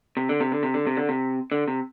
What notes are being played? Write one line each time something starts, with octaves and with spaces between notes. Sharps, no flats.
C3
D3
C3
D3
C3
D3
C3
D3
C3
D3
C3